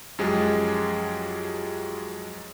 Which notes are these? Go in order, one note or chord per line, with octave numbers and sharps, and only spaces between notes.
F#2 F3 F#3 G#3 G4 G#4